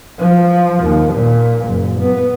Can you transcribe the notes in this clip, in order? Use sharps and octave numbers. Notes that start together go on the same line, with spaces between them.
F3
D#2
A#2
F#1
B3